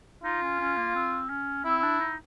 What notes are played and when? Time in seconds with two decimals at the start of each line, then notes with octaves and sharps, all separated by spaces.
0.24 D#4 F4
0.42 C#4
0.59 C#4
0.77 A#3
0.95 C4
1.29 C#4
1.65 C4 E4
1.83 D4
2.00 D#4